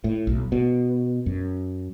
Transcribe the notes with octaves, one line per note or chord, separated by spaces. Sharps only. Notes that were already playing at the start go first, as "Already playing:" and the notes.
A2
B1
B2
F#2